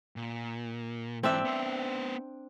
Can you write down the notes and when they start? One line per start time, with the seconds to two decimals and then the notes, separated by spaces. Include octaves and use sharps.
0.16 A#2
1.23 G#2 E3 C4 D4 E5
1.45 B3 C5